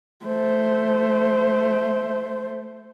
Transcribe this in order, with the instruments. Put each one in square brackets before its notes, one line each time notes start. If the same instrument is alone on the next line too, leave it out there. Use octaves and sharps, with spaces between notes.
[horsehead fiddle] A3 C5